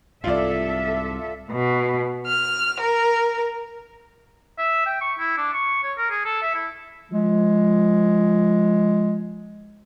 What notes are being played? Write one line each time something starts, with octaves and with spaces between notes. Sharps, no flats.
C2 G#2 F4 A4 D5 E5
B2
F6
A#4
E5
G5
C#6
E4
D4
C#6
C#5
A#4
G#4
A4
E5
E4
F3 G#3